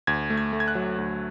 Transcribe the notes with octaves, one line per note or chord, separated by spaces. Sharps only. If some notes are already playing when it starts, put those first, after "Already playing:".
D2 G#6
A3
G#6
A3
G#6
F#6
F#3
D2